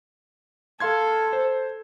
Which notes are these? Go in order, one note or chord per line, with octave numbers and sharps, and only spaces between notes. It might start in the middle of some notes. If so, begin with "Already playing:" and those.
A4 F5 C6 G#6
C5